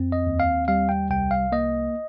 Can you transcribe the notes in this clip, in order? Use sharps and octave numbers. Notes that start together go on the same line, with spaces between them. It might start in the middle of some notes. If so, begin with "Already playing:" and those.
Already playing: F2 C4
D#5
D#2
F5
G3 F5
G5
C2 G5
F5
A#3 D#5